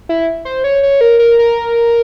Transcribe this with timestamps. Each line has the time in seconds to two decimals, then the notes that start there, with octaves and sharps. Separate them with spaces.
0.09 E4
0.45 C5
0.64 C#5
0.83 C#5
1.01 A#4
1.19 A#4
1.39 A#4